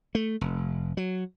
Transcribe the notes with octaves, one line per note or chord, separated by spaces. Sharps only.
A3
F1
F#3